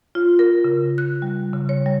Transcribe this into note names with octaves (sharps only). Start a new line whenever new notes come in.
F4
A#4
C#3
F#6
G3
C#3
C#5
G3